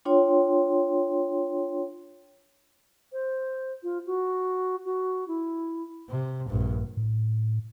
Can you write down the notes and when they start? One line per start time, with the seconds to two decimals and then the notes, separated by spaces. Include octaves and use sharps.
0.05 D4 F4 C#5 G5 C6
3.12 C5
3.82 F4
4.06 F#4
4.85 F#4
5.27 E4
6.09 C3
6.49 A#1 G2
6.97 A2